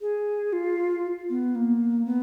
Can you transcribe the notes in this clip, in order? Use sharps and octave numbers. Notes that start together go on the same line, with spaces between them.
G#4
F4
B3
A#3
B3